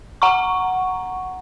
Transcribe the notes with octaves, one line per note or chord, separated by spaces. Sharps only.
F#5 A#5 C#6